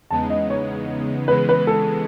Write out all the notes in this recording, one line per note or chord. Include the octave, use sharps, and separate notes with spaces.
E2 C#3 G#3 B3 D#4 A5
D#5
C#5
C#3 E3 G#3 B3 B4
B4
A4